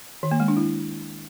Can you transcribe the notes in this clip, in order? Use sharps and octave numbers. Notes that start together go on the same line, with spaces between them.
D#3
A#3
G#3
D4
E4